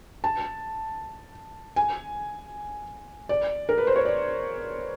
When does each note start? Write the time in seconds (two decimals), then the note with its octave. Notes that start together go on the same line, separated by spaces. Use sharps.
0.24 A5
1.76 G#5
3.29 D5
3.69 A#4
3.78 B4
3.87 C5
3.96 C#5
4.05 D5